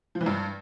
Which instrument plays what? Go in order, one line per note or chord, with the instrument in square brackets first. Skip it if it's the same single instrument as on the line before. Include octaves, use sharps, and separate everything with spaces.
[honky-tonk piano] F3
E3
G2